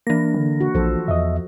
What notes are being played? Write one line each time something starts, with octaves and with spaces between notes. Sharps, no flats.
E3 A#3 D4 A#6
D3
F#4
A#1 F3 A4 C5
E2 D#5 E5